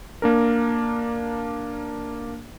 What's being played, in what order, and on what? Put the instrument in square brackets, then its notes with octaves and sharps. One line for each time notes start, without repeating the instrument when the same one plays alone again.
[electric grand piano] A#3 D4 A#4